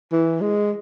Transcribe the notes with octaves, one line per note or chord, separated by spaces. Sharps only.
E3
G#3